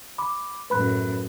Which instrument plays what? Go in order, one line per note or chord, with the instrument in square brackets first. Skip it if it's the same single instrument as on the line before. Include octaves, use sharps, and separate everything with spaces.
[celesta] B5 D6
[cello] F#2 A2 [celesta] B4 B5 F#6